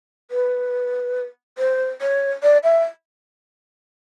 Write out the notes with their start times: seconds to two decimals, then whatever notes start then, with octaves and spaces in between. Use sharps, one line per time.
0.31 B4
1.58 C5
2.01 C#5
2.43 D5
2.63 E5